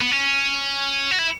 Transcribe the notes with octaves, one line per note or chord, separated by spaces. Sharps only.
B3
C#4
F#4
E4